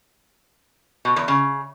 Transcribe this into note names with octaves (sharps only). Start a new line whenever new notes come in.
B2
E2
C#3